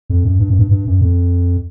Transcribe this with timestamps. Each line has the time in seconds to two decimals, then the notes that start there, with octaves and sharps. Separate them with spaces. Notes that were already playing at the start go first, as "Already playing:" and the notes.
0.10 F2
0.25 F#2
0.40 G2
0.50 F#2
0.59 G2
0.71 G2
0.87 F#2
1.01 F2